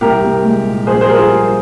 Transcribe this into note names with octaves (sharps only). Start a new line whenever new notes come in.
C2 G4 A#4
C2
G#3
A#2
A#1 G#4 C5
G#4 C5
G3 A#4
F4 G#4
G3